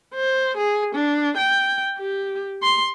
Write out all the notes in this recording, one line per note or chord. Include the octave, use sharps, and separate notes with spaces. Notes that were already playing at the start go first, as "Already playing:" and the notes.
C5
G#4
D4
G5
G4
C6